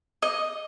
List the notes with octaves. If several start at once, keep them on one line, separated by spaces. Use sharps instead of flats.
D#5